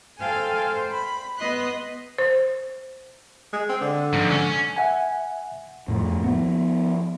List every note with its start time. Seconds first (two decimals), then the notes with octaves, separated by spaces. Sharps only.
0.18 A4 C5 F5 G5 G#5
0.57 C5 G5
0.91 B5
1.39 B3 B4 D#5 C6 F#6
2.18 C5
3.53 G#3
3.69 C4
3.81 D3
4.13 F2 G#2
4.30 C#4
4.76 E5 F#5 G#5
5.88 F2 A2
6.24 F3 B3